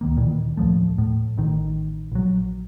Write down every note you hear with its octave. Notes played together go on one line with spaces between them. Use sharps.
D2 D#3 A#3
A#2 D#3 E3
D#2 A2 F3 A3
A2
A1 A2 D#3
A#1 F#3